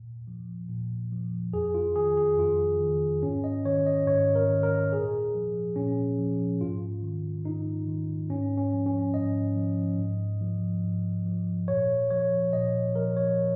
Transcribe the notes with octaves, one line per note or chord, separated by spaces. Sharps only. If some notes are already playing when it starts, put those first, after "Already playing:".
Already playing: A#2
F3
A#2
F3
F2 G#4
F4
D#3 G#4
G#4
F2 F4
D#3
G#2 C#4
D#5
D#3 C#5
D#5
G#2 C#5
A#4
D#3
A#4
A#2 G#4
F3
A#2 C#4
F3
G#2 F4
D#3
G#2 D#4
D#3
G#2 C#4
C#4
F3
C#4
G#2 D#5
F3
G#2
F3
G#2
F3
A#2 C#5
F3 C#5
A#2 D#5
F3 A#4
C#5